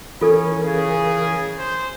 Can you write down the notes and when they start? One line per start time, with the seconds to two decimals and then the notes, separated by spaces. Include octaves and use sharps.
0.21 E3 C#4 F4 A4 A#4
0.64 C#3 G#4
1.59 C5